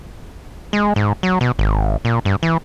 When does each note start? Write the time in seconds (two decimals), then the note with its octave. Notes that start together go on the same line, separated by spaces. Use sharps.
0.73 G#3
0.96 G#2
1.23 F#3
1.41 B2
1.59 G#1
2.05 A#2
2.25 G2
2.43 E3